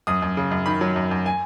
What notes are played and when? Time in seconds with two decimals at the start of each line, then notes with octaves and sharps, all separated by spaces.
0.07 F#2 D#6
0.22 F#2
0.37 C#3
0.51 F#2
0.66 D#3 B5
0.81 F#3
0.96 F#2
1.11 F#2
1.26 G#5